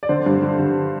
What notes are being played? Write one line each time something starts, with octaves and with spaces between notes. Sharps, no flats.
D5
D3 C5
G2
D3
D3